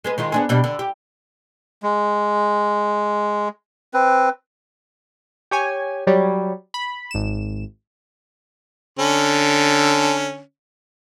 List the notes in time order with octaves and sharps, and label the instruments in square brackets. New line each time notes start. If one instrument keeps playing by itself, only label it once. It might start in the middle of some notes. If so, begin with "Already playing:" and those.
[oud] G#3 G#4 B4
D#3 G#3 F4
B3 D4 G#4
B2 G3 D4
D3
G4
[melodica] G#3
C4 B4
[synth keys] G4 C#5 G#5
F#3 G3 C#5
B5
G#1 E7
[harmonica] D3 C#4